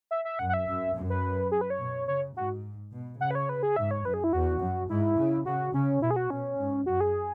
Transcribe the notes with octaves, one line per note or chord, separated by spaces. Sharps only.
E5
E5
F#2 F#5
F#5
E5
F#2
F#2
B4
G#4
B4
C#5
B2
C#3 C#5
G#2 F#4
B2
C#3 F#5
B4
C#5
B4
G#4
G#2 E5
C#5
F#2 B4
G#4
E4
E2 F#4
F#2
G#2 E4
C#3
C#3 F#4
C#3 C#4
B2 E4
G#4
F#4
B2 C#4
G#2
F#2 F#4
G#4